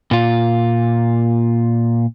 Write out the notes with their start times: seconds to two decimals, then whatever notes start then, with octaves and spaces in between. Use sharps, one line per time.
0.11 A#2 F4